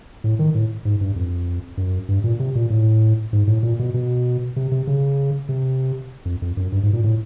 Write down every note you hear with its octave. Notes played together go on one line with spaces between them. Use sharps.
A2
D#3
A2
G#2
G2
F2
F#2
G2
A#2
C3
A#2
A2
G#2
A2
A#2
B2
B2
C3
C3
C#3
C3
F2
F2
F#2
G2
G#2
A#2
A2